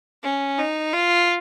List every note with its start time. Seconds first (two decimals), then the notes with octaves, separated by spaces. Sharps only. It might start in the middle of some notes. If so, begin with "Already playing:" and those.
0.23 C#4
0.58 D#4
0.93 F4